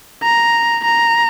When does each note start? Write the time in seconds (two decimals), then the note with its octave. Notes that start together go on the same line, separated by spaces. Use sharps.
0.23 A#5
0.85 A#5